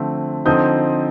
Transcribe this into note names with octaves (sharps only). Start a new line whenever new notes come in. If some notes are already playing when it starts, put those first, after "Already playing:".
Already playing: D3 F3 A3 C4
D3 F3 C4 D#4 D#6 G6